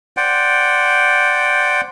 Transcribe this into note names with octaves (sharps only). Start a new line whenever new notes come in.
C5 D5 F#5 G5